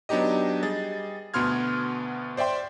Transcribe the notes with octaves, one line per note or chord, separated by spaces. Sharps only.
F#3 B3 D4 D#4 G4 D#5
G3 G#4 D#5 A6
D2 B2 B3 C6 F6 G#6
C5 D5 E5 G5 C6